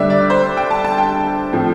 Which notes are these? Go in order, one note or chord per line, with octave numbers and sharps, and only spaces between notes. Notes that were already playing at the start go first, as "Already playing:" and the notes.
Already playing: D3 G3 D4 E5
D5
C5
G5
A5
A5
G5
A2 F3 C4